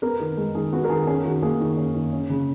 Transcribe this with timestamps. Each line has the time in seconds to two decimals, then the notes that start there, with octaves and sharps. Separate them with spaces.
0.02 B3 A#4
0.20 D#3
0.37 G#3
0.55 D#3 G#4
0.72 B3 F#4
0.84 A#4
0.90 D#3 G#4
1.07 C#4 G#4
1.25 D#3 F#4
1.43 A#3 G#4
1.60 D#3
1.77 C#4
1.95 D#3
2.13 C#4
2.30 C#3